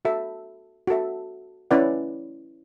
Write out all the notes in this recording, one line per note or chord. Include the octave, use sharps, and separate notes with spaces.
F#4 A4 E5
F#4 A4 E5
C#4 E4 B4 D5 F#5